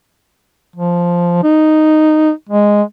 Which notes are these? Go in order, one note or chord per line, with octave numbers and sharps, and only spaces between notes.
F3
D#4
G#3